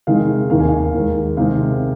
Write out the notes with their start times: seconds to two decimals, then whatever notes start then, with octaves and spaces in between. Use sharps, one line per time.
0.07 C3 D#3 G#3 F5
0.50 D#2 D#3 A#3 F5
0.60 G#5
0.68 F5
0.94 D#2 D#3 G#3
1.37 C3 D#3 G#3 C4 F5